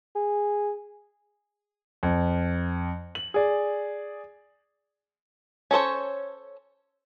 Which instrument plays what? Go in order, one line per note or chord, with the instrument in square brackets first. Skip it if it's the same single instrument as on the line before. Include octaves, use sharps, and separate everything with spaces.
[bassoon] G#4
[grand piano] F2
F#7
G#4 D5
[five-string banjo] C#4 A4 C5 C#5